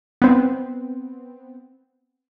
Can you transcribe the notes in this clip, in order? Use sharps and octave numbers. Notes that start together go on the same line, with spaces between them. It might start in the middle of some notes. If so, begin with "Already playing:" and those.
B3 C4